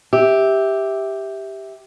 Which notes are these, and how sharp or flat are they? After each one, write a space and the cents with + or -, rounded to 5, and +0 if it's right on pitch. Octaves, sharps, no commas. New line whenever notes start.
G4 +0 E5 -10